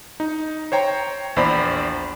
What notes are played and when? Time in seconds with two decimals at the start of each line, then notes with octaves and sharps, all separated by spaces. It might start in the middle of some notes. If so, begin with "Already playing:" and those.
0.20 D#4
0.72 C5 C#5 G5 A#5
1.36 A#1 E2 C5 D5 B5